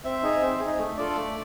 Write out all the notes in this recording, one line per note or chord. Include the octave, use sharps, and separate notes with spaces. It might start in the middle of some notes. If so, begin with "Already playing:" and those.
C4 E5
D#4 G#4
C4
G#4
D#4
A3
D4 F4 A4 D5
A3